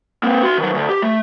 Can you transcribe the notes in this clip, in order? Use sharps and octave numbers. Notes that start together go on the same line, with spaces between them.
A#3 C4
F#4 C6
D#3 F#3
D2
G4
A3